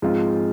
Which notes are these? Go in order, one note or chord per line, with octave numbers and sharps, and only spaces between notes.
G#2 F3 G#3 C4 F4